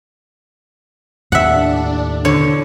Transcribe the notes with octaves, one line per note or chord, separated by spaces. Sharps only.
D#2 A2 D4 E5 F#5
B2 D3 E3 C#5